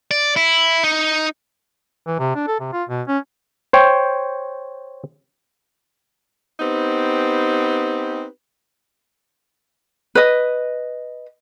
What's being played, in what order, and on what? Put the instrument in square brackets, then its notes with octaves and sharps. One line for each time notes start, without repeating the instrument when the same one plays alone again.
[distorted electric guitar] D5
E4
D#4
[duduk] E3
C3
D4
A4
C3
F4
B2
C#4
[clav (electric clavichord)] C5 C#5 G5
[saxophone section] B3 C4 D#4 G4 B4
[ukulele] B4 D#5